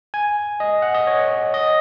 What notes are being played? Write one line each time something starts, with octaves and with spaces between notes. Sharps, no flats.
G#5
D#5
F#5
D#5
C#5
D#5